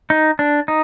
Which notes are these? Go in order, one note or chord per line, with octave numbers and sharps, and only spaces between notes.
D#4
D4
D#4